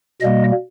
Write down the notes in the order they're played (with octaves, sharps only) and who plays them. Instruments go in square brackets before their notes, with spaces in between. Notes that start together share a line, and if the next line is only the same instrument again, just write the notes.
[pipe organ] B2 G3 A#3 D#5